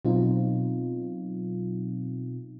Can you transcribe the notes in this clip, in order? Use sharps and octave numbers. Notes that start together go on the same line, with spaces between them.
B2 F#3 C4 D#4 F4